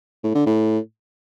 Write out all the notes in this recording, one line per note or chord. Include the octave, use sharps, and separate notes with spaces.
A2
D3
A2